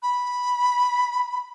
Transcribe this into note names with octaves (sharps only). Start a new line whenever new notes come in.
B5